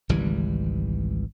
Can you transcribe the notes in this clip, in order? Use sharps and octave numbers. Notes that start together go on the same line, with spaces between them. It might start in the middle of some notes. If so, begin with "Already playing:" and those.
G#1 C#2 E3 G3